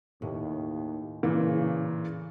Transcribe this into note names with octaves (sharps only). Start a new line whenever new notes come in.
D#2 A2
A#2 C#3 E3